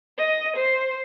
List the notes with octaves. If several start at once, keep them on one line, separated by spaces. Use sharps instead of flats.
D#5
C5